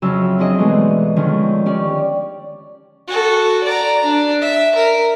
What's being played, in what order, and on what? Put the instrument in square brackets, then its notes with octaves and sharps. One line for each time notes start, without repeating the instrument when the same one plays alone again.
[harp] F2 C#3 F#3 E5 E6
C4 D4 E4 G#4 D#5
G#2 B2 E3 A3 G#4
D3 D#3 F3 G#3 C#4 G#4
C#4 G4 D5
[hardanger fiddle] F#4 A4
D5 A#5
D4
E5
A#4